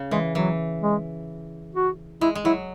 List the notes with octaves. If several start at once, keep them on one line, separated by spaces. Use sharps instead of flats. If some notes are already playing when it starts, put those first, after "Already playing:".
Already playing: C#3
E3 G#3
E3 F#3
G#3
F#4
G#3 E4
G#3
F#3 E4